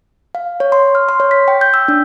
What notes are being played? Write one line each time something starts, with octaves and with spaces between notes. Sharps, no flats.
F5
C#5
C6
F6
C6
C#5
B6
G5
G6
E6
D4